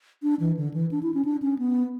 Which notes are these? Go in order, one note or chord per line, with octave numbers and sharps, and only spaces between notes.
D4
E3
D3
E3
D4
E4
C#4
D4
C#4
B3